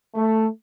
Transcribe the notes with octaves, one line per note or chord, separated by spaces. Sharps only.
A3